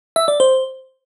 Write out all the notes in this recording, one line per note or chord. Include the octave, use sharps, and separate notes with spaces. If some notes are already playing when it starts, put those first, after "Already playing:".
E5
D5
C5